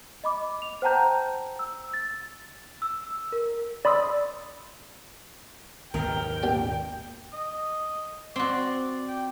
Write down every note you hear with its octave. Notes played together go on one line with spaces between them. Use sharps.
D#5 B5 D6
F7
C5 F#5 G5 A5 A#5 G6
E6
A6
E6
A#4
D5 B5 C6 D#6 E6
G#1 D#2 B2 D#3 A#4 G5
A#1 G4 D5
D#5
C4 F#4 D5
G5